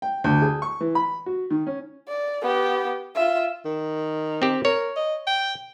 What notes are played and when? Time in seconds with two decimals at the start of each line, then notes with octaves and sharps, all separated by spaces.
0.02 G5
0.24 D2
0.42 G#4
0.62 C#6
0.81 E3
0.95 B5
1.26 F#4
1.51 D#3
1.67 C#4
2.08 D5
2.42 B3 G4
3.15 F4 E5
3.65 D#3
4.42 C4 G4
4.65 A#4 C#5
4.96 D#5
5.27 G5